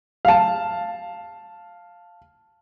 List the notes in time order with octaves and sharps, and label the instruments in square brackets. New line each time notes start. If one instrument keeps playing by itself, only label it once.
[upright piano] F5 A5